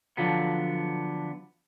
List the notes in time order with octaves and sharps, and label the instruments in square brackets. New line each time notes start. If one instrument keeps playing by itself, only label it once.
[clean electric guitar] D3 F3 F#3 B3